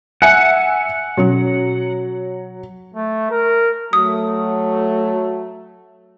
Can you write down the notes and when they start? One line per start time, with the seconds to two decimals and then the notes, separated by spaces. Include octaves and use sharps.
0.22 E5 F#5 G#5 C#7
1.17 B2 F#3 C#4 F#4
2.95 A3
3.31 A#4
3.93 F#3 A3 D#6